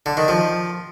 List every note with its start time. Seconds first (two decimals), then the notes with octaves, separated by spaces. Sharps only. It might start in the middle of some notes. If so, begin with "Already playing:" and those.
0.06 D3
0.17 D#3
0.28 F3